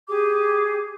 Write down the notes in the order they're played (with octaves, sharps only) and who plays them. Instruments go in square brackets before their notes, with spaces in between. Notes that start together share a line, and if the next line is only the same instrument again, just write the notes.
[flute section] G4 G#4 D6